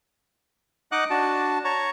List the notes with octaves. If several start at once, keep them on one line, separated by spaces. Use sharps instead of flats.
D#4 D#5 F#5 D6 D#6 F#6
D4 F#4 A5
C#5 A5 A#5 C#6